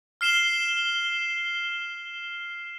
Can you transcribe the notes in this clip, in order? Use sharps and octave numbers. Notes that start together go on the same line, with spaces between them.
F6 C7 E7 G7